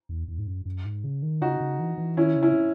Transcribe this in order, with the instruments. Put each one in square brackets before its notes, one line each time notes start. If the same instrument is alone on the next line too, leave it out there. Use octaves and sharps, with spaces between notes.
[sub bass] E2
E2
G#2
F#2
F#2
G#2
C#3
D#3
[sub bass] C#3 [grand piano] D#4 F#4
[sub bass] C#3
E3
E3
[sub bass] D#3 [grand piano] C#4 E4
[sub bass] C#3
[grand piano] C#4 E4